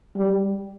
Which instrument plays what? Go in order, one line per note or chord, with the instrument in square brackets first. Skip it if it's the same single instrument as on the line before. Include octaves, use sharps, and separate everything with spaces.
[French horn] G3